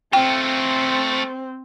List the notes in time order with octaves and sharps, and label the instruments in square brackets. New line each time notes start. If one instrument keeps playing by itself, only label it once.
[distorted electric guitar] A3 F4 [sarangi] C4 [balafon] G5